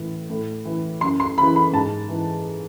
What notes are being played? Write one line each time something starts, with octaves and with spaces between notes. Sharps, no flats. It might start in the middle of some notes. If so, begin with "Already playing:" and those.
Already playing: A2 E3
A2
E3
F#2 C6
C6
C#3 E3 B5
B5
G#2 A5
E3